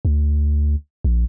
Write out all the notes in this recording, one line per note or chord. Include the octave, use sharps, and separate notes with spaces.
D2
A#1